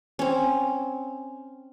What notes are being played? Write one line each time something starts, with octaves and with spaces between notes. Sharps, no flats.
C4 C#4